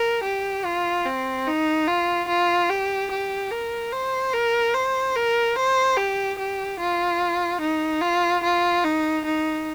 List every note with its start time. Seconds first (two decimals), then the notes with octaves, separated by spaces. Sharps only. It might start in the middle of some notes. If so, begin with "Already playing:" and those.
Already playing: A#4
0.24 G4
0.65 F4
1.06 C4
1.47 D#4
1.87 F4
2.28 F4
2.69 G4
3.11 G4
3.51 A#4
3.92 C5
4.33 A#4
4.74 C5
5.15 A#4
5.56 C5
5.97 G4
6.39 G4
6.80 F4
7.61 D#4
8.01 F4
8.44 F4
8.84 D#4
9.25 D#4